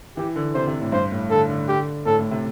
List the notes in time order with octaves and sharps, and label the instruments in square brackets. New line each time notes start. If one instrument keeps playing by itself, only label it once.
[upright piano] E3 [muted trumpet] G4
[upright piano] D3
[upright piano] C3 [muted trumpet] C5
[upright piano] C3
A2
[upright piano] G2 [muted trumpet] C5
[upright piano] A2
[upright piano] D3 [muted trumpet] A4
[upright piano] D3
[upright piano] D3 [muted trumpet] G4
[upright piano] A2 [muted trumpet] A4
[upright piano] A2
C3